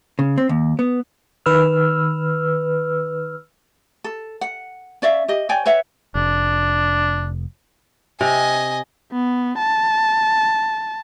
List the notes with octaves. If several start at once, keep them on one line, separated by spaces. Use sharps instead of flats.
C#3
C4
D#2
B3
D#3 B4 E6 F6
A4
F#5
C#4 D5 E5 F5
G4 D#5
C#5 D5 G5 G#5
B4 C#5 E5 F#5
F1 D4
C3 D#5 G#5
B3
A5